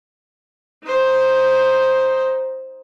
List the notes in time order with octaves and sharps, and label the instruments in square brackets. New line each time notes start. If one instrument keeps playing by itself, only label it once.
[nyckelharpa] D#4 C5